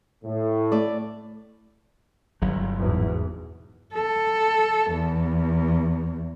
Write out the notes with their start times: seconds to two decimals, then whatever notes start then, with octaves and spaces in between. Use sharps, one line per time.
0.25 A2
0.72 A3 D5
2.42 G1 F#3
2.80 G#1 E2 B2
3.94 A4
4.90 E2